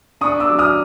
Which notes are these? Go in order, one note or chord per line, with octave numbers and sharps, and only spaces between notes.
D4 C#6 D#6
D6 E6
F#3
D#6 F6